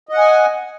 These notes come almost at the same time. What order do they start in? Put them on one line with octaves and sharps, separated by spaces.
D#5 F#5 G#5